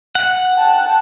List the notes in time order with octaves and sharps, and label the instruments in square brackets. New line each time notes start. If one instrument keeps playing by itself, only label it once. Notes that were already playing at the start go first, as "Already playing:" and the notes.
[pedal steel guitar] F#5
[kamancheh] G5 A5